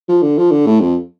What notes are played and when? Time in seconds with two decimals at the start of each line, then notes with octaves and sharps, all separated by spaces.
0.09 F3
0.22 D3
0.38 F3
0.51 D3
0.67 A2
0.80 F2